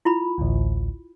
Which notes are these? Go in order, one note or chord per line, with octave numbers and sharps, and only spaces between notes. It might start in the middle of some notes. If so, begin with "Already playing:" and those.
E4 F4 B5
A1 D2